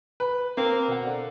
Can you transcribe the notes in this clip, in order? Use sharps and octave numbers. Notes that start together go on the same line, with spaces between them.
B4
A#3 C4
B2 F#5
D3